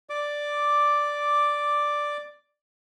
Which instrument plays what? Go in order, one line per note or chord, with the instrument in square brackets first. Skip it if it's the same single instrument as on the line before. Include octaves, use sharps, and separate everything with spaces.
[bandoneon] D5 D6